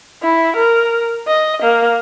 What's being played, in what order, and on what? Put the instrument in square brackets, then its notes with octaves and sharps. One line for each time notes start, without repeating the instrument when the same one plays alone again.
[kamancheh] E4
A#4
D#5
A#3